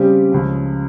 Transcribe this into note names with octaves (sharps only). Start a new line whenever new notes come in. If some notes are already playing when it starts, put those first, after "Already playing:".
Already playing: C#3 G3 C4 G4
C#2 C#3 F3